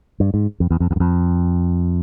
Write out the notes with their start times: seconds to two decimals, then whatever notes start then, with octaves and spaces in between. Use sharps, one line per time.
0.20 G2
0.34 G#2
0.60 F2
0.71 E2
0.80 F2
0.91 E2
0.96 F#2
1.00 F2